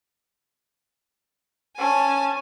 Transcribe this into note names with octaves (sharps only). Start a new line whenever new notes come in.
C#4 G#5 A5